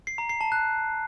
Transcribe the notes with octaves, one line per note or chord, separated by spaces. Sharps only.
C7
A#5
C7
A5
F#6